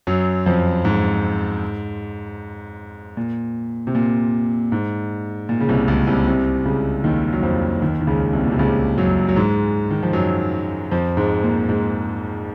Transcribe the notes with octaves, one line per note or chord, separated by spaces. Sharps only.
F#2 F#3
F2 F3
G#2
A#2
C3
A#2
G#2
A#2
C#3
C2 C3
C#2 C#3
C2 C3
C2 C3
C#2 C#3
D#2 D#3
F#3
F2 F3
D#2 D#3
D#3
C#2 C#3
C2 C3
A#2
C3
C#2 C#3
F#2 F#3
F#3
G#2 G#3
D#3
F3
F#2 F#3
F2 F3
G#2 G#3
A#2 A#3
G#2 G#3